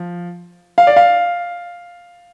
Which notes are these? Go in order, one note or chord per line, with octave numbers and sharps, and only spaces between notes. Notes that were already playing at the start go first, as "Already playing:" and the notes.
Already playing: F3
F5
D5
F5